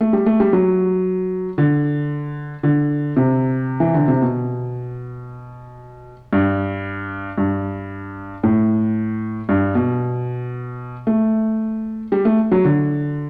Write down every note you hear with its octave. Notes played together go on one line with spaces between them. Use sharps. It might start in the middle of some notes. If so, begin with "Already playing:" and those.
A3
G3
A3
G3
F#3
D3
D3
C3
E3
D3
C3
B2
G2
G2
A2
G2
B2
A3
G3
A3
F#3
D3